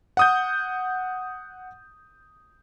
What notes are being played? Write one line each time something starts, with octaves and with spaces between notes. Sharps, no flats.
F#5 D#6 G6